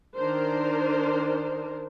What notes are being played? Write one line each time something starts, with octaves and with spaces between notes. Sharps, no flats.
D#3 D4 A#4 C5